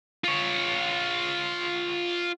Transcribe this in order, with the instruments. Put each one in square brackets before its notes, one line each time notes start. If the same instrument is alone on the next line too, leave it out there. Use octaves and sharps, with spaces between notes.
[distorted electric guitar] F4 C#5